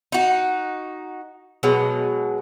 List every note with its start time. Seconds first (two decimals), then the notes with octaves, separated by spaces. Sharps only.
0.12 D#4 F#4
1.63 B2 F#3 G#3